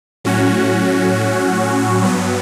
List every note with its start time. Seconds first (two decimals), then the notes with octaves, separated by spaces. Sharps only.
0.24 A2 F#3 C#4 F#4
2.01 G2 F#3 B3